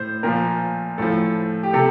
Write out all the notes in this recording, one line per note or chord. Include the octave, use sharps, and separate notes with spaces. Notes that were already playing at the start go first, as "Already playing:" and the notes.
Already playing: A2 C5
A#2 F3 A#4
A2 F3 A4
G4
C3 A4